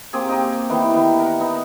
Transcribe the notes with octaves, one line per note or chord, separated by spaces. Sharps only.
A#3 C4 G4 G#4
D#4 G4
D#3 E3 B3
D#3 B3
A#4 F#5
B3 D#4